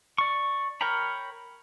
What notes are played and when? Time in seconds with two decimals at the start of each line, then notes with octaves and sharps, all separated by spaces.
0.18 D5 C#6
0.81 A#4 C#5 G5 A#5 B5